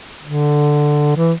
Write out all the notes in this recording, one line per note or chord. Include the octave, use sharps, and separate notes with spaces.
D3
E3